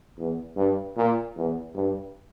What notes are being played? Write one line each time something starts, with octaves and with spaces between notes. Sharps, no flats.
E2
G2
A#2
E2
G2